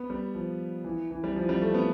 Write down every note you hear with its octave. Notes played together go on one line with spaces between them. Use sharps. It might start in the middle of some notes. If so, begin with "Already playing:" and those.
Already playing: B3
G3
F3
E3
E3
G3
F3
G3
A3
B3